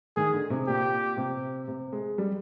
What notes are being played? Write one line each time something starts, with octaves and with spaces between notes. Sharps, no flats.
D#3 G#4
D3
C3
A#2 G4
C3
C3
G#3
G3